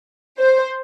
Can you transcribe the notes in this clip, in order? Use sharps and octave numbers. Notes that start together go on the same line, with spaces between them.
C5